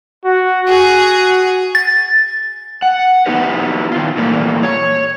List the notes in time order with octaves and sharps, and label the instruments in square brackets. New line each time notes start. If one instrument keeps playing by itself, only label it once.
[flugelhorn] F#4
[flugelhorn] F#4 [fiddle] G#4
[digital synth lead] A6
[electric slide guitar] F#5
B3 D#4 E4 G4 B4
D#3 F4
A#2 E3 G3 A3 A#3
C#5